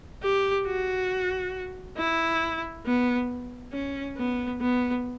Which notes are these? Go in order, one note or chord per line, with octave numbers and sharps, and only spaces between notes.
G4
F#4
E4
B3
C#4
B3
B3